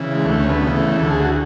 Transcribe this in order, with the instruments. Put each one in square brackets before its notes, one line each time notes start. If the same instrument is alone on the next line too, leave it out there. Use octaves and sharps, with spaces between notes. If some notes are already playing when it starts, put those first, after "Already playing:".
Already playing: [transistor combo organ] C#3 E3
G#3
D2 A3
C#4
B3
C#3 E3
A3
D2 A4
G#4
F#4